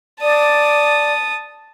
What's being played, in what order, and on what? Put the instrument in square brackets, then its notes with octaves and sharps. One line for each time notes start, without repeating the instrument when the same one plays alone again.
[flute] D5 [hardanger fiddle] A5 D#6